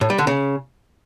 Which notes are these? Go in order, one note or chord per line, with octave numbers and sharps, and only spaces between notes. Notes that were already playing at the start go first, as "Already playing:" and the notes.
A2
G3
D3
C#3